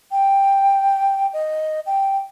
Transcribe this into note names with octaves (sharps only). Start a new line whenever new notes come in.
G5
D#5
G5